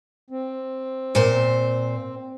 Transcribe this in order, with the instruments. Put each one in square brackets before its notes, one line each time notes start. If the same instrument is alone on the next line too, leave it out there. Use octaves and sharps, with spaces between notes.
[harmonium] C4
[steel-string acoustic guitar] A#2 C5